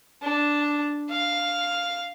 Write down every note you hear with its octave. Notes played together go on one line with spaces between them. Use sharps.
D4
F5